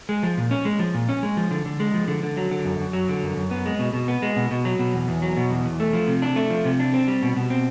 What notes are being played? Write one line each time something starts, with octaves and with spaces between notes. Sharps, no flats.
G#3
F3
A#2
C#4
G#3
F3
A#2
C#4
G#3
F3
D3
D3
G#3
F3
D3
D3
F#3
D3
F#2
F#2
F#3
D3
F#2
F#2
B3
G#3
B2
B2
B3
G#3
B2
B2
F#3
B2
E2
E2
F#3
B2
E2
E2
A3
F3
C3
D4
A3
F3
C3
D4
C4
G3
B2
B2
C4